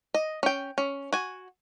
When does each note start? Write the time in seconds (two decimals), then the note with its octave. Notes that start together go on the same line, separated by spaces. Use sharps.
0.14 D#5
0.43 C#4 G5
0.78 C#4
1.13 F#4 G#5